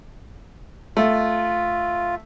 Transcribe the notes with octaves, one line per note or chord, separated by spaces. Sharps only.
A3 F4